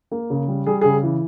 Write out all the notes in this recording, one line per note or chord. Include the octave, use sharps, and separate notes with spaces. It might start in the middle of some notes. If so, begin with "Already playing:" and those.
A#3
C#3
G3
G3 G#4
C#3 G#4
E3